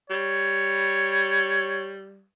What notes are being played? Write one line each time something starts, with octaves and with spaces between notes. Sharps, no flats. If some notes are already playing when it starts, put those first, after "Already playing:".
G3 C#5